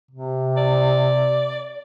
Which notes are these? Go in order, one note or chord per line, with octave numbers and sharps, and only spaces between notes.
C3
D5